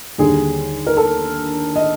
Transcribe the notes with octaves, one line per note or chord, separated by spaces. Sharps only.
D#2 D3 G3 G#4
A#4
A4
D#5